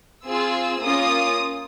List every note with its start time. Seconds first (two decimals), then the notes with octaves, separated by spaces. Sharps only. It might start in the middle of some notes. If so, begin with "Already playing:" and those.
0.25 C4 F4 G#4 E6
0.83 A#3 C#4 F4 D#6